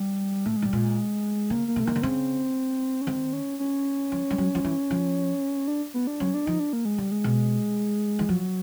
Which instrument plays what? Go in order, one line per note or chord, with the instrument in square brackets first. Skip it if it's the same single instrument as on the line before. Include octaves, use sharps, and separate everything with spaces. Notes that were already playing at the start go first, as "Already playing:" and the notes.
Already playing: [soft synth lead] G3
[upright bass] A2 [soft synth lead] A3
[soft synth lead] G#3
[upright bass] A2 [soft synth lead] G3
[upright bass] A#2 [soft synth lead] G#3
[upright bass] C#3 [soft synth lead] A#3
[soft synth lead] A#3
[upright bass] C3
[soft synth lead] A3
[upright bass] D#3 [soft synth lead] A#3
[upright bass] D3
[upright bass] C#3 [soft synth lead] C4
[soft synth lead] C#4
[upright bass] D#3 [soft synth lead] C4
[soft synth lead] C#4
C#4
[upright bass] F3
G3
F#3
F3
E3
F3
[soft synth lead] D4
B3
D4
[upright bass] F#3 [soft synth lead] C#4
[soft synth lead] D4
[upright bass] F3 [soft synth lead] D#4
[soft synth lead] D4
A#3
G#3
[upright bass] D3 [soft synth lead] G3
[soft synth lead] G#3
[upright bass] B2
E3
[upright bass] F3 [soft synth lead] F#3